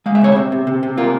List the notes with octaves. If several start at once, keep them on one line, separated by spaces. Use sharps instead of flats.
G#3 F5
E5
C3 C#5
C3 E5
C3
C3
C3
A#3 F4